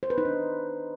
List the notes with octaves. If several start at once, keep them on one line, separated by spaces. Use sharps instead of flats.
C5
B4
D#4
D4